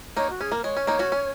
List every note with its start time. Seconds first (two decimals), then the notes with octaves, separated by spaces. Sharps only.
0.17 A#3 D#4 C#5
0.30 F#4
0.41 C#4 G#4
0.52 A#3 A#4
0.64 G#3 C#5
0.77 C#4
0.87 A#3 D#4
0.99 C#4 F#4
1.12 C#4